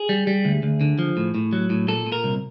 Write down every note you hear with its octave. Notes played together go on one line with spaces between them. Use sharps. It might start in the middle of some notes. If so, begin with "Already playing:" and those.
Already playing: G#4
G3
G3
D2
D2
D3
F3
A2
A2
F#3
A2
A#2 A4
A#2
A#4
C2